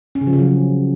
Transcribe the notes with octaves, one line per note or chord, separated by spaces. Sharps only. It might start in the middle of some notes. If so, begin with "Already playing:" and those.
C#4
C#3
F3
C#3
F#3